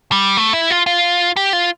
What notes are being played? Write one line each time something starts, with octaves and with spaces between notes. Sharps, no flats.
G3
A3
E4
F4
F4
G4
F4